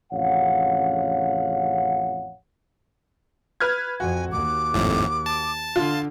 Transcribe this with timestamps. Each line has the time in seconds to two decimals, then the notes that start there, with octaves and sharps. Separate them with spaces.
0.12 A1 F2 C#3 C#5 F5 F#5
3.60 B4 F6 G#6
4.00 F2 F#4 G#5
4.32 D#2 D6
4.74 G#1 F2 A2
5.26 A5
5.76 D3 F4 C6